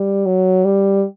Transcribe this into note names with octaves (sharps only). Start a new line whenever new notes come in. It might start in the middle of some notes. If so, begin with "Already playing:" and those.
Already playing: G3
F#3
G3